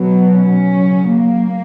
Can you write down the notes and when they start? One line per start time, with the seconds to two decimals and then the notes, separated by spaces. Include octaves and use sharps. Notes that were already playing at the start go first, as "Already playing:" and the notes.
Already playing: B2 F#3
0.30 C#4
0.71 C#3 F#3
1.11 A#3